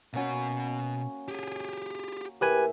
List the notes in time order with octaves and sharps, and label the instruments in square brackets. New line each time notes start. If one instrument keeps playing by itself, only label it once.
[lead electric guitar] B2 F#5 [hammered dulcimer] A#3 C#4 F#4
[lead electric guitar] G4 G#4
[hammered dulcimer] A2 G#4 E5 [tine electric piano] G4 B4 G#5 [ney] A#4